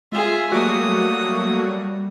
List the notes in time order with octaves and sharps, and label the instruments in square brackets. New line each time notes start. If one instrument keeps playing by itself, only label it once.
[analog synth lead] G#3 [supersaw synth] F4 [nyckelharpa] G#4 E5
[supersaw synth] F#3 A3 A#3 [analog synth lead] G3 [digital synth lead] F#4 [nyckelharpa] D#6